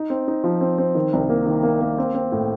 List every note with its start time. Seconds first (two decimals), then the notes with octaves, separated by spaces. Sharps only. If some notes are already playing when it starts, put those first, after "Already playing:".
Already playing: D#4
0.10 C4
0.28 D#4
0.44 F3
0.61 C4
0.78 C4
0.95 D#3
1.13 C2
1.29 A#3
1.46 D#3
1.63 A#3
1.81 A#3
1.98 C4
2.15 C4
2.32 A2